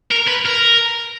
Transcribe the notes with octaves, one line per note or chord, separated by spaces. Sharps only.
A#4
B4
A#4